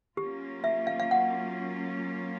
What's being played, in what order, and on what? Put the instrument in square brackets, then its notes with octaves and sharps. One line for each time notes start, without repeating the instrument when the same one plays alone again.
[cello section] F#3 A#3 C#4 F4 [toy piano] G4
[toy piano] E5
F5
F5
F#5